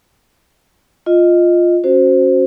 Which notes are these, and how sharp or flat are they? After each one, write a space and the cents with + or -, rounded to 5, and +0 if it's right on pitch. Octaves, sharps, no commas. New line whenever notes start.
F4 +0 D#5 +0
C#4 -15 F#4 +0 C5 +0